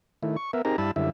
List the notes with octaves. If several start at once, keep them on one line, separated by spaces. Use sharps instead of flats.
D#3 A3 E4
C#6
B3 A#4 E5
C4 D#4 G4 G#4 A#4 A#5
G2 G3 E4 A5 B5 E6
F#2 D3 G3 E4 E5